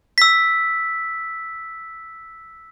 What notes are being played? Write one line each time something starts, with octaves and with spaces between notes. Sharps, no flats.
E6 B6